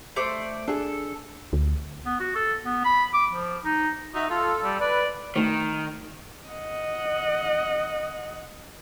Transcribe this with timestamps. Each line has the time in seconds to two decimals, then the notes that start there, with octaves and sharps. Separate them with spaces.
0.16 A3 C5 D5
0.68 D4 G#4 A4
1.53 D2
2.06 B3
2.20 F#4
2.36 A4
2.65 B3
2.85 B5
3.14 D6
3.32 F3
3.65 D#4
4.14 D#4 F#4 E5
4.30 F4 A4
4.63 G3
4.80 B4 D5
5.36 D2 D#3 A3
6.48 D#5 F#5